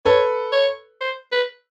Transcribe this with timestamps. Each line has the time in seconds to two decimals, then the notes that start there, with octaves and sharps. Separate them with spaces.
0.05 A4 B4 C#5
0.52 C#5
1.01 C5
1.32 B4